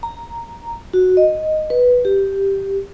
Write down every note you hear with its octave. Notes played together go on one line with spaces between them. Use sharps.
A#5
F#4
D#5
B4
G4